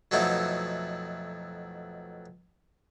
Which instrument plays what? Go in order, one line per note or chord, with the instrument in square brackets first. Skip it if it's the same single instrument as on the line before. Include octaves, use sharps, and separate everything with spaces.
[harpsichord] F2 B2 F#3 A3 D#4 E4